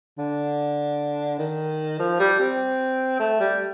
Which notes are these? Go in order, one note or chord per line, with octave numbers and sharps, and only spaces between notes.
D3
D#3
F3
G3
C4
A3
G3